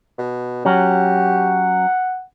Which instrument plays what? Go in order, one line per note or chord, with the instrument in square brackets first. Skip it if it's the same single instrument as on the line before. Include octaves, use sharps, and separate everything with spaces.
[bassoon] B2
[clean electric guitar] F#3 C#4 [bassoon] G4 [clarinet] F#5